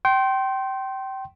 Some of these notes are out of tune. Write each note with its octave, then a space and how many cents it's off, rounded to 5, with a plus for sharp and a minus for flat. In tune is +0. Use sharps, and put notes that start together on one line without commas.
G5 -25 C6 +15